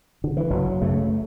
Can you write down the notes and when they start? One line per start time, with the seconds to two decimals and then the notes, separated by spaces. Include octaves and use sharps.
0.24 D3
0.37 E3
0.50 F#1 F#3
0.82 F#2 C#3 A3